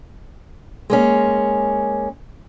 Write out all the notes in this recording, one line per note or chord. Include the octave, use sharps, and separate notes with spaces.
G#3 A#3 C#4